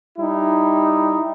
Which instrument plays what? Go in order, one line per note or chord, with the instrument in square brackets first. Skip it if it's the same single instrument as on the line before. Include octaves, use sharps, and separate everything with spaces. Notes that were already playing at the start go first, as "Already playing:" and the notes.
[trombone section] G3 D#4 E4